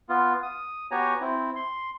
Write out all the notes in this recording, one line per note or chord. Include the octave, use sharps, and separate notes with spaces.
B3 F4
D#6
B3 F#4 G4 C#5 G#5 A#5
C4 E4
C6